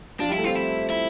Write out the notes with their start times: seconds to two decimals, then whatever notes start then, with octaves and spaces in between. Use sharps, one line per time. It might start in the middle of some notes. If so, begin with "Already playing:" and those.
0.20 F3 D4 F4
0.29 G3 E4 G4
0.38 A3 A4
0.44 C4 F4 C5
0.56 E4
0.90 E4